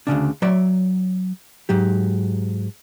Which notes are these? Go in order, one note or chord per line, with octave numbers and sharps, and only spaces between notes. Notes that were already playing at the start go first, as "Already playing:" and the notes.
D2 G2 C#3 D4
F#3 C#5 D5 E5
G#2 F#3 G4